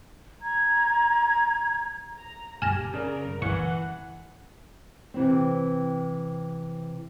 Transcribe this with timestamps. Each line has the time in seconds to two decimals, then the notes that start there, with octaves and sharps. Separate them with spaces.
0.42 A#5 G#6
2.19 A#5
2.62 G4 G#5 A5 F6 A#6
2.94 C#3 A#4 D5
3.42 E3 F#5 C#6
5.14 C3 E3 C4